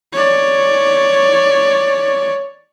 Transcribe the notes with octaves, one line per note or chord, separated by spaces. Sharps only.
C#5 D5